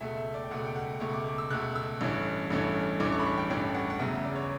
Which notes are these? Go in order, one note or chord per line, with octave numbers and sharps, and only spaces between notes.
C#2 B2 A3 E5
E5
D5
G5
C#2 B2 A3 F#5
G5
F#5
C#2 B2 A3 C#6
D6
D6
E6
C#2 B2 A3 F#6
E6
A1 G2 E3 A3 C#4
A1 G2 E3 A3 C#4
A1 G2 E3 A3 C#4 D6
C#6
B5
C#6
G5
A1 G2 E3 A3 C#4 G5
F#5
F#5
E2 C#3 F#3 B3 E5
D5
C#5